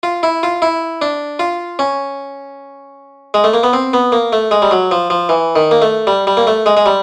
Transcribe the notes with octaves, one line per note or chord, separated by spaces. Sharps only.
F4
E4
F4
E4
D4
F4
C#4
G#3
A3
A#3
B3
C4
B3
A#3
A3
G#3
G3
F#3
F3
F3
E3
D#3
A#3
A3
G3
G3
A#3
A3
G#3
G#3
G3